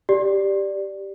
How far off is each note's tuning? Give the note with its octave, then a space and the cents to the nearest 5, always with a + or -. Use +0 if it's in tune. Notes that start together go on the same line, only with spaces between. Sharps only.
G4 +0 D5 +0